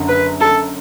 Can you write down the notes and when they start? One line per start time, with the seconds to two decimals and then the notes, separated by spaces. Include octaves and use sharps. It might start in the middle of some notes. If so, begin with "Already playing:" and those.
Already playing: F#1 F#2 D3
0.09 B4
0.41 A4